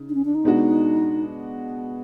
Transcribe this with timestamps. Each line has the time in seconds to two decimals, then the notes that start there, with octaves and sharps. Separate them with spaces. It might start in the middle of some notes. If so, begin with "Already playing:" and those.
Already playing: C#3 D#4
0.09 D4
0.15 C#4
0.25 D4
0.35 D#4
0.44 B2 G#3 B3 D4 F#4